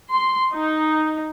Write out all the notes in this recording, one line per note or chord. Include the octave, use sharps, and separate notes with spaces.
C6
D#4